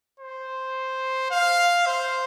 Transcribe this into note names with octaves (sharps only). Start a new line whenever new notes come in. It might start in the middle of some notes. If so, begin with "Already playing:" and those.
C5
F5
C5